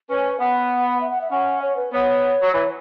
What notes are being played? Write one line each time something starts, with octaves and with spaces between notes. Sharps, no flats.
C#4 B4
B3 F#5
E5
F#5
E5
C#4 F#5
C#5
B4
B3 C#5
F#3
E3 C#5